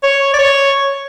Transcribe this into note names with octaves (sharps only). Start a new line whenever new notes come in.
C#5
D5
C#5